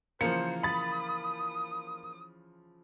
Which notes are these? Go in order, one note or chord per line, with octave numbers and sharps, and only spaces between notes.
C#3 E3 F3 A#3 C5 C#7
B5 D#6 A6